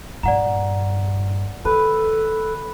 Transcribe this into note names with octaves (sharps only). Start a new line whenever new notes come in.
G2 A#2 D5 F#5 A#5
D#3 A4 B4